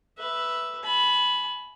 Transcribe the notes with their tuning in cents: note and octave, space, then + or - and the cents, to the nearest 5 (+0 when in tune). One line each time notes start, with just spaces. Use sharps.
B4 -5 E5 +0
G#5 +40 B5 +0